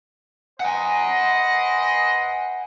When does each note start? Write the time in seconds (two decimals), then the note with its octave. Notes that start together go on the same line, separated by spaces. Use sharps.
0.60 B4 C5 D#5 F#5 G#5